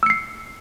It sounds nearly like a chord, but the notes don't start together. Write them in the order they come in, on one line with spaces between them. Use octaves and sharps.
E6 C#7 C7